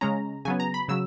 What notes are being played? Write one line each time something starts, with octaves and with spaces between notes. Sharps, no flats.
C#3 G#3 C#4 A#5
C#3 F#3 B3 G#5
A#5
B5
C#3 F#3 E6